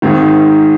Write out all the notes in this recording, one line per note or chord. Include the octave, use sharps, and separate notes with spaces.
G#1 G#2 D#3